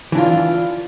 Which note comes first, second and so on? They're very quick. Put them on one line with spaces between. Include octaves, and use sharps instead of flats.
E3 D4 F4